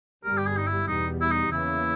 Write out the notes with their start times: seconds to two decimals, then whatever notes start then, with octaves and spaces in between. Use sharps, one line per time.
0.24 G1 G2 G3 A#4
0.37 G4
0.46 G#4
0.57 D#4
0.67 E4
0.88 E2 B2 G3 D#4
1.21 E4
1.31 D#4
1.52 E2 C#3 E3 A#3 E4